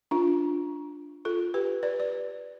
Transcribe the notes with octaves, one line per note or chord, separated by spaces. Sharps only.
D4 F4
F4 A4
G4 B4
B4 D5
D5